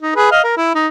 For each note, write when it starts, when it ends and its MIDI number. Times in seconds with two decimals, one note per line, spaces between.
0.02 0.15 63
0.16 0.27 68
0.16 0.27 71
0.31 0.42 75
0.31 0.42 77
0.44 0.56 70
0.57 0.70 64
0.75 0.87 63